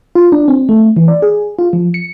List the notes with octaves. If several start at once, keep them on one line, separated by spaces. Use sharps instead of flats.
F4
D4
C4
A3
E3
D5
G#4
F4
F3
C#7